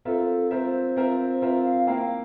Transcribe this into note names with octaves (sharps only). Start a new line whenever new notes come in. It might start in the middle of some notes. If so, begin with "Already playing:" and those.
C4 F4 A4 A#4 E5
C4 F4 A#4 C5 E5
C4 F4 A#4 E5
C4 F4 A#4 E5
F5
A#3 E4 A#4 F5 G5